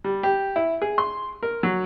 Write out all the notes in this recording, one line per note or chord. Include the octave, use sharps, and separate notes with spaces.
G3
G4
E4
G#4
C6
A#4
F#3